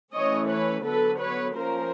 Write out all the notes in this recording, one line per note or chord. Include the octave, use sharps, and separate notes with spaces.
E3 A3 C#4 C#5 D#5
B4 C#5
D3 F#3 B3 A4 B4
B4 C#5
F3 A#3 C#4 A#4 C5